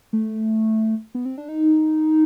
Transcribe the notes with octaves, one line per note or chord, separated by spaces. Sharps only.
A3
B3
C4
D4
D#4